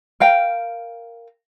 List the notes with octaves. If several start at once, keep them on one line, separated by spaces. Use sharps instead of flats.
A#4 F5 G5